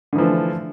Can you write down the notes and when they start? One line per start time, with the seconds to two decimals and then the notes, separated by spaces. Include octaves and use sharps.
0.13 D3
0.15 E3
0.18 F3
0.21 A3